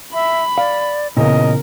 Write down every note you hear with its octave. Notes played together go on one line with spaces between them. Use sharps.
E5 B5
D5 F5
A#2 C#3 E3 B3 A#4 D#5